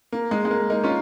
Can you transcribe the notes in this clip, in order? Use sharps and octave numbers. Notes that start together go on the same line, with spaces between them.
A#3
G#3
G#3
A#3
A#3 D#4
C#4 F4